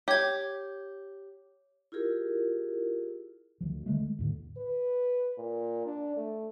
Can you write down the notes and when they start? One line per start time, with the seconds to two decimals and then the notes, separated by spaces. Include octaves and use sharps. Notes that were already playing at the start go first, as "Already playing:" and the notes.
0.08 G4 C#5 G#6
1.92 E4 F4 G4 G#4 A#4
3.61 D2 F3
3.86 D3 G#3 A3
4.19 D#2 A2 D3
4.58 B4
5.38 A#2
5.86 D4
6.16 A3